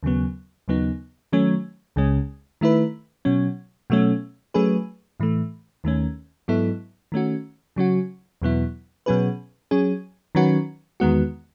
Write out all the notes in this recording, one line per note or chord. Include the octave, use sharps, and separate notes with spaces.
D#2 C#3 F#3 B3
D#2 C#3 F#3 B3 D#4
D#3 F#3 A3 C#4
C#2 C#3 G#3 C#4
D#3 A3 E4 B4
B2 F#3 C#4
B2 F#3 A3 C#4
F#3 A3 C#4 G#4 B4
A2 E3 A3
D#2 D#3 A3 C#4
G#2 F#3 B3 E4 A4
D#3 A3 C#4 F#4
C#3 F#3 C#4 F#4
E2 B2 F#3 B3 E4
B2 F#3 C#4 G#4 B4
F#3 C#4 G#4
D#3 F#3 C#4 F#4 B4
E2 D#3 G#3 B3 F#4